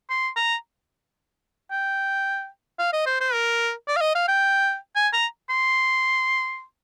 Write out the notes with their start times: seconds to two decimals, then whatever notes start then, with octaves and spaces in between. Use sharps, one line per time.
0.09 C6
0.36 A#5
1.71 G5
2.79 F5
2.93 D#5
3.06 C5
3.20 C5
3.33 A#4
3.88 D5
3.96 F5
4.01 D#5
4.15 F5
4.28 G5
4.95 G#5
5.13 A#5
5.50 C6